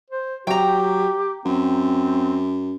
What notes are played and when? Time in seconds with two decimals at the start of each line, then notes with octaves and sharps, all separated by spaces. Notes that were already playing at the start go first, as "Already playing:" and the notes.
0.10 C5
0.47 F#3 G4 G5 A#5
1.45 F#2 C4